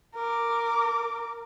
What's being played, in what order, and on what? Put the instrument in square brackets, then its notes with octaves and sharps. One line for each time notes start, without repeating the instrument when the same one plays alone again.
[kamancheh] A#4 D6